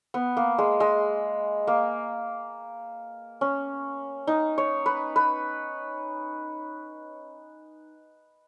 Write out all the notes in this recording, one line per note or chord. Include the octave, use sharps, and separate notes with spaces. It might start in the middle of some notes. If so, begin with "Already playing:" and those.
B3
A#3
G#3
G#3
A#3
C#4
D#4
C#5
B4
B4